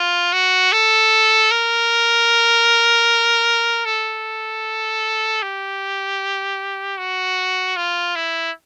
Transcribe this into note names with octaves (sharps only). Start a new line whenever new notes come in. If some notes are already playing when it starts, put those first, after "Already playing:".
Already playing: F4
F#4
A4
A#4
A4
G4
F#4
F4
E4